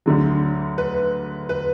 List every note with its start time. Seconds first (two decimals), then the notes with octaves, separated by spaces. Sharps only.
0.06 D2 D3 F#3
0.78 B4
1.49 B4